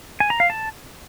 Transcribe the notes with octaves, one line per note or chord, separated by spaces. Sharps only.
G#5
A#5
F5
A5